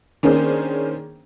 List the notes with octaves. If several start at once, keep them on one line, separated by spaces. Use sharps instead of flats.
D#3 A#3 C#4 D4 G#4 C5